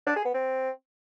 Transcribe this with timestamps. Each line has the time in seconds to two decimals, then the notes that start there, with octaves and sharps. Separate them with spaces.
0.07 D4
0.16 G#4
0.25 B3
0.34 C4